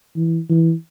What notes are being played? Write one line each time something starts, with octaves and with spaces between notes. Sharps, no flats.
E3
E3